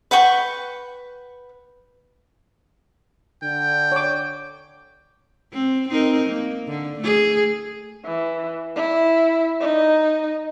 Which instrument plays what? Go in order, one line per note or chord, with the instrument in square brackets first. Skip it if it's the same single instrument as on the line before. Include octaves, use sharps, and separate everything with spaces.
[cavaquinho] B4 F#5 G5 C#6
[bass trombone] D3 [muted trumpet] G5
[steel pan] C#5 D6
[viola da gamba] C4
C4 D#4 A#4
A#3
D3
A3 G#4
[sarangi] E3
E4
D#4